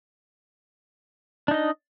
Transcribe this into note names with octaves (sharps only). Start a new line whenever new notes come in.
D4 D#4 D#5